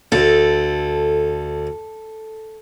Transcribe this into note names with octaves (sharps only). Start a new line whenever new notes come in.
D2 A4